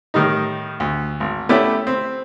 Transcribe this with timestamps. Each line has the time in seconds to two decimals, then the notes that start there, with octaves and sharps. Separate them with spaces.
0.14 A2 D#3 G3 D#4
0.80 D2
1.20 G#1
1.49 A3 B3 C#4 E4 G4 D5
1.87 C4